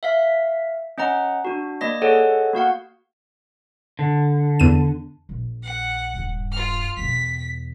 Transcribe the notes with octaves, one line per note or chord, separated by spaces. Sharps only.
E5 F5 B6
C#4 D#5 F#5 A#5
D4 F#4
A#3 D5 D#5 A#6
G#4 A4 C#5 D#5 F#5
A#3 F#4 F5 F#5
D3
E2 D#7
A#1
F#5
D#1 G2
F4 F6
E2 B2 B6